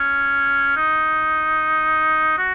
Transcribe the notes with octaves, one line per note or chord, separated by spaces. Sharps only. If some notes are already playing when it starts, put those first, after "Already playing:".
Already playing: C#4
D#4
F#4